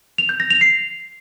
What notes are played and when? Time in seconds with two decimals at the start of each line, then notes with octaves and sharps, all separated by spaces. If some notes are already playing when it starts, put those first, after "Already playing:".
0.18 F7
0.29 G6
0.40 A#6
0.50 F7
0.61 C7